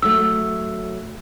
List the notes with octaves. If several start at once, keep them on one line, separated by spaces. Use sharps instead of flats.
F#3 A3 E6